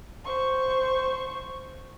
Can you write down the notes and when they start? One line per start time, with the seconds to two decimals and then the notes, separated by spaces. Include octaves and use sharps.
0.25 C5 C#6